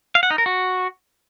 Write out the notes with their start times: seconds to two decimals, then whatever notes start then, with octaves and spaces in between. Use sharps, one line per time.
0.15 F5
0.23 F#5
0.31 D#4
0.38 A#4
0.46 F#4